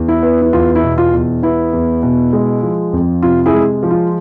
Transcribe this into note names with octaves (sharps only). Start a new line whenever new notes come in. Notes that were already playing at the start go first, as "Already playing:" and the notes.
Already playing: E2
E4
B3
E4
E2 F4
E4
B2
F4
E2
B3 E4
E2
B2
G#3
F3
F2
C3 F4
E4 G#4
G#3
F3
F4